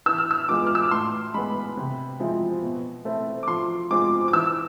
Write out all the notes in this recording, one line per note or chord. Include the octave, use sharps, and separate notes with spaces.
E3 E6
F6
E6
G#3 B3 F4 D6
F6
E6
D6
A2 C6
G#3 B3 B5
C3
F3 G#3 C4 E4
B2
A3 C4 E4
D6
F3 C6
G#3 C4 F4 D6
D6
E3 E6